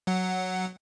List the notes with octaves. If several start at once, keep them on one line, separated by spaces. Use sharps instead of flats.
F#3 F#5